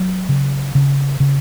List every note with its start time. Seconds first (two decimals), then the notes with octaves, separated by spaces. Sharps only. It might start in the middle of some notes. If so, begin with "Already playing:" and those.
Already playing: F#3
0.29 C#3
0.75 C#3
1.20 C#3